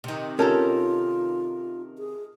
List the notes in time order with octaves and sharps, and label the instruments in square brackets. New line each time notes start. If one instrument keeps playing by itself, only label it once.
[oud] C3 D#3
[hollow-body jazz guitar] C#4 G4 A4 [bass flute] F4 [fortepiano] A#4 A5
[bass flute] G#4